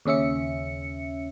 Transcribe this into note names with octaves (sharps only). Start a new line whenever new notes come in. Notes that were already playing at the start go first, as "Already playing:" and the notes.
D#2 C#3 C#4 E5 C#7